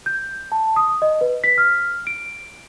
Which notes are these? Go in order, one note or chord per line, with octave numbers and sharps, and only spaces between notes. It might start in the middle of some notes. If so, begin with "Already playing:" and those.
G6
A5
D#6
D#5
B4
B6
F6
D7